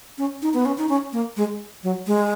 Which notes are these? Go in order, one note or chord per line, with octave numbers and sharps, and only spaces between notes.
C#4
D#4
B3
C#4
D#4
C#4
A#3
G#3
F#3
G#3